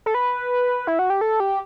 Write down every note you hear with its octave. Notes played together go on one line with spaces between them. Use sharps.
A4
B4
E4
F#4
G4
A4
G4